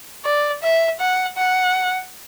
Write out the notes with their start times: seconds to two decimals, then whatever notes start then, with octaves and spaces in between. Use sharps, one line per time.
0.24 D5
0.62 E5
1.00 F#5
1.37 F#5